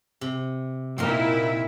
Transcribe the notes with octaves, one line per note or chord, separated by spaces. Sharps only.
C3
A#2 C4 D#4 E4 A#4